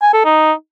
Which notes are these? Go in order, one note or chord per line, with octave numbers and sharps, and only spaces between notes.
G#5
A4
D#4